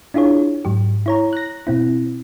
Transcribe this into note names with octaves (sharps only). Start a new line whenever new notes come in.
D4 E4 F4 G#4 C#5
G#2 F#3 G4
E4 C#5 A#5
F#6 A#6
B2 C4 E4